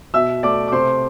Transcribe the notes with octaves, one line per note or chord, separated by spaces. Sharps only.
B2 E5 E6
A3 D5 D6
D6
C3 C5 C6